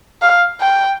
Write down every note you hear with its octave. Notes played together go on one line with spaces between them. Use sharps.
F5
G5